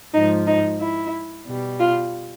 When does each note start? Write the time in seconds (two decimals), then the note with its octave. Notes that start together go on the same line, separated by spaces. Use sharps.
0.14 G#2 F3 D#4
0.47 D#4
0.80 E4
1.47 B2 G3
1.80 F4